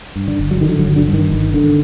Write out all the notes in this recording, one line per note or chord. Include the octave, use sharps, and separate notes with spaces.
G2
D3
G1
F#3
D3 D#3
F#3
G1
D3
G2
D#3
G1
D3